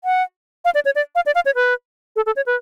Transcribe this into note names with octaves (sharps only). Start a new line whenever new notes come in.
F#5
F5
D5
C#5
D5
F5
D5
F5
C#5
B4
A4
A4
C#5
B4